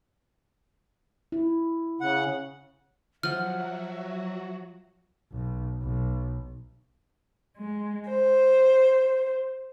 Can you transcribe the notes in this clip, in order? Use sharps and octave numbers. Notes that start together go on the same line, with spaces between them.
E4
C#3 F#5
F3 F#3 F#4 E5 F#5 F6
B1
B1
G#3
C5